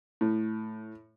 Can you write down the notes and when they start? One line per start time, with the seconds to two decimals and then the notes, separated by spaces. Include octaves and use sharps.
0.21 A2